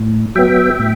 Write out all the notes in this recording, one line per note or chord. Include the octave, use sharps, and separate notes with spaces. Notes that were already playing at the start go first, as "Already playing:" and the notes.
Already playing: A2
F#3 B3 E5 G5
A2